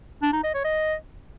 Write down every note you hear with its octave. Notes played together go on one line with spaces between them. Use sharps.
D4
D#4
D#5
C#5
D#5